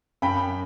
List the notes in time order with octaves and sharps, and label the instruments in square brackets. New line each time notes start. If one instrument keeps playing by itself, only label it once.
[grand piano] F#2 G5 B5